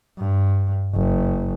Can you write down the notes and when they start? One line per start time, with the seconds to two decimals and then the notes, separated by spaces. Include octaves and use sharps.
0.18 G2
0.94 F#1